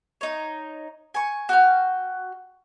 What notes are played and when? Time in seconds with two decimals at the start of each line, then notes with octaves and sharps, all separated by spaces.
0.21 D#4 C#5
1.14 G#5 C#6
1.49 F#4 G5 F6